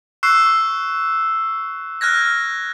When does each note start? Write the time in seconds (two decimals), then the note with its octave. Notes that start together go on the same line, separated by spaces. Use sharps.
0.23 C#6 E6 F#6 C7
2.01 F6 F#6 G#6 A#6